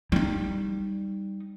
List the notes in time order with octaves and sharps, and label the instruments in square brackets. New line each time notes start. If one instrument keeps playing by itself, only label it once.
[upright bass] G3 D#4